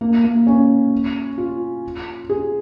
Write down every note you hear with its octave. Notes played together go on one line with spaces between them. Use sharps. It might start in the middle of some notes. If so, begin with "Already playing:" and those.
A#3
A#3
C#4
F4
G#4